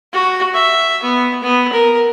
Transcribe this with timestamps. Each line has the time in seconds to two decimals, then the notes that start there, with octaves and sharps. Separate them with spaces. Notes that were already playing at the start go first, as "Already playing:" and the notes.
0.13 F#4
0.54 E5
1.03 B3
1.43 B3
1.72 A#4